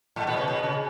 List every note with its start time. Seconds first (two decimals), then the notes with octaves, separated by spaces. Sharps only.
0.16 A2 A3
0.27 B2 B3
0.36 C#3 C#4
0.48 B2 B3
0.63 C#3